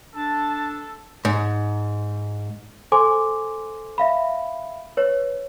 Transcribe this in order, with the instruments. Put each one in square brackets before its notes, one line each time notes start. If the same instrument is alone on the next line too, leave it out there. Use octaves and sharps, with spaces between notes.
[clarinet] D4 [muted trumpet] A4 [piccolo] A5
[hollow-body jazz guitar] G#2
[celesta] A4 C5 G#5 C6 D6
E5 F5 B5
B4 C#5